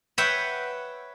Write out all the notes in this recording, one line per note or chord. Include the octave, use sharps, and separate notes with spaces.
B4 C#5 E5 F#5 G5 B5